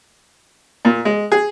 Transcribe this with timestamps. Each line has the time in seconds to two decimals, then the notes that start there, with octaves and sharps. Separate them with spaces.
0.85 A#2
1.05 G#3
1.32 G#4